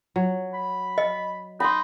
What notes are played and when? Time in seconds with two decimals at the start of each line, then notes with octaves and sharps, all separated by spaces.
0.16 F#3
0.53 B5
0.98 D#5
1.60 D#4 B5 C6